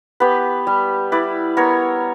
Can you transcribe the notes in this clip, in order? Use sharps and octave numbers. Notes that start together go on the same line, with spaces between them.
B3 G4 B4
G3
E4 B4 D5
B3 A#4 C#5